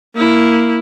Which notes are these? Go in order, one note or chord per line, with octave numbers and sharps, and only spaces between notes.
A#3 E4